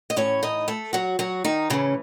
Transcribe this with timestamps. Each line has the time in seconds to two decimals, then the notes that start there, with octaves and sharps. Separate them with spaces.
0.10 D#5
0.16 A2 E3 C#4 C#5
0.43 D#4 D#5
0.68 A3 A4
0.93 F#3 F#4
1.19 F#3 F#4
1.44 D#3 D#4
1.70 A2 C#3 E3 C#4